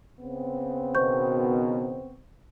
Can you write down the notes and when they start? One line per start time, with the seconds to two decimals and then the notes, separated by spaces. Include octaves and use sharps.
0.20 C#3 B3 C4
0.95 B2 D#3 C5 C#6 G6